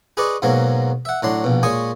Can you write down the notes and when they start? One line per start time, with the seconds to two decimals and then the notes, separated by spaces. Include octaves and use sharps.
0.17 G#4 B4 D5 D#5 C#6
0.42 G#2 B2 F#3 G#3 A#3
1.05 E5 F#5
1.23 A2 F#3 D4 C6
1.44 A#1 B2
1.63 A#2 G#3 C#5 G#5 C#6 D#6